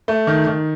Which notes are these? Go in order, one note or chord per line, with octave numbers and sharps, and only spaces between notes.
A3
D#3
D#3